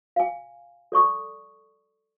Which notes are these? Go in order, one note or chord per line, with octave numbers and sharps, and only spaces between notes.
F5 G#5
A4 D5 C#6 D#6